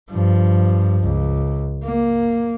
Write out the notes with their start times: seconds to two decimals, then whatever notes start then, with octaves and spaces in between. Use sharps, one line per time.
0.10 G2 F3
1.03 C#2
1.83 A#3